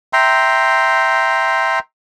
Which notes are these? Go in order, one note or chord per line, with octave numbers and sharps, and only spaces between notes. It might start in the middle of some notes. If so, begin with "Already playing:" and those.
E5 G5 A#5 C6